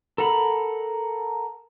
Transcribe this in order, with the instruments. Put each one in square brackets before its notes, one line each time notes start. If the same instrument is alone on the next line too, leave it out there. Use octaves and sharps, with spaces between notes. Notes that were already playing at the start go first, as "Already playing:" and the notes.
[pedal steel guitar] A4 A#4 F#5 A#5 B5